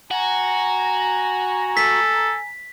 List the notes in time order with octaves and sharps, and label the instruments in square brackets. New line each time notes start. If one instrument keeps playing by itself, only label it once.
[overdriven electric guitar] F#4 [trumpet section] G#5 A#5
[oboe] A4 [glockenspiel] B6